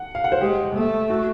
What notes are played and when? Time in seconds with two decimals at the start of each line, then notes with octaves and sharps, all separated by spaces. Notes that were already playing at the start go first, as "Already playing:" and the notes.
Already playing: F#5
0.15 F5
0.24 F#5
0.32 C5
0.41 G#3 G4
0.75 A3
1.10 F#4